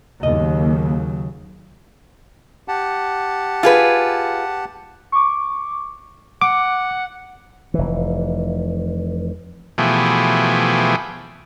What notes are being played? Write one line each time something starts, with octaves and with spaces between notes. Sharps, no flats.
D#2 C#3 F#3 D#5
G4 F#5 A5
F4 G#4 B4
C#6 D6
F#5 D6
F1 E3
B2 E3 F3 A3 G4 G#4